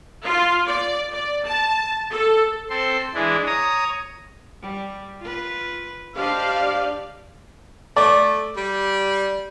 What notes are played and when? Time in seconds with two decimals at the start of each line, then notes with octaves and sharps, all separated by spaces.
0.24 F4
0.66 D5
1.10 D5
1.45 A5
2.11 A4
2.70 C4 A4 C6
3.15 E3 G#3 D4 E4
3.47 C#5 A#5 D#6
4.62 G3
5.20 F4 B4
6.16 D4 G4 C5 D5 D#5 F5
7.97 A3 D5
8.57 G3